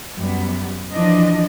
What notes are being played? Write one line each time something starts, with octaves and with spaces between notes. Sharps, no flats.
F#2 G3 B3
E3 F3 D4 D#5